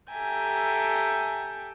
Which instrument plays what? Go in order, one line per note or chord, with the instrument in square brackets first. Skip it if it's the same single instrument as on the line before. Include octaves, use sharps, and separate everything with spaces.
[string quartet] G4 A4 E5 G5 G#5 A#5